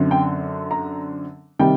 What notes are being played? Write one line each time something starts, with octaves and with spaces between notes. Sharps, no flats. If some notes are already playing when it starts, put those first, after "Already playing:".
Already playing: F#2 D3 F#3 C4
G5
A#5
C3 D#3 G3 G5